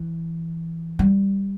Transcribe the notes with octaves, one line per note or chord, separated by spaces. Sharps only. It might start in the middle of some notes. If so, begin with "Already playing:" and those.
Already playing: E3
G3